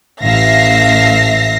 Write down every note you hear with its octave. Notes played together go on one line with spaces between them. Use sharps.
A1 E5 F5 A#6 C7